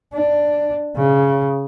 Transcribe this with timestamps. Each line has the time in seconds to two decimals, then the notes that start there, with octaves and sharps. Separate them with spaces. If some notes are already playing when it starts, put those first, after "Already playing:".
0.14 D4
0.96 C#3